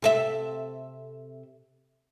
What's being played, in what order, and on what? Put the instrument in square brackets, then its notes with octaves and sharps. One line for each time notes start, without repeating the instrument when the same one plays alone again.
[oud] C3 A4 E5